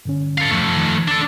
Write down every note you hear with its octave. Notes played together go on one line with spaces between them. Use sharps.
G2 D3 C#4
A4 F5
G2 F3 A3
D#3
D4 A4